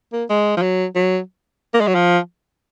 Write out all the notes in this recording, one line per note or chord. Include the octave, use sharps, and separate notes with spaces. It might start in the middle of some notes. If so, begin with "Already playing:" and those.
A#3
G#3
F3
F#3
F#3
A#3
G#3
F#3
F3